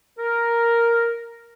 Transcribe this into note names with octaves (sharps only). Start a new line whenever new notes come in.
A#4